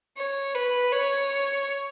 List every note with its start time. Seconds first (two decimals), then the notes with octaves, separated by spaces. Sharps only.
0.18 C#5
0.55 B4
0.92 C#5